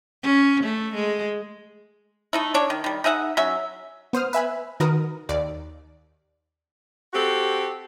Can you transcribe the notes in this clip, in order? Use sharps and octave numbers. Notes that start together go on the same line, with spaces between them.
C#4
A3
G#3
A3 D#4 E4
D4 C#5
D#3
D#3 G3
D#4 G#4 E5 F#5
F#3 C#4 E5
B3 C5 D#6 F6
B4 E5 G#5 B5
D#3 F#4 A#4 B4 D#6
D#2 D5
C4 F#4 G4 A4